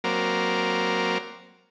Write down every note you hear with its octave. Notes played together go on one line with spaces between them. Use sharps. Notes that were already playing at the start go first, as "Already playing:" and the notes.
F#3 A#3 C4 A#4 D5